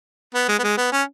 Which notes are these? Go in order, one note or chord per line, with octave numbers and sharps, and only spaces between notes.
B3
G#3
B3
G#3
B3
C#4